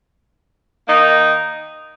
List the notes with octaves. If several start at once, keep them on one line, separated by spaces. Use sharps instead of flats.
D#3 A#3 D#4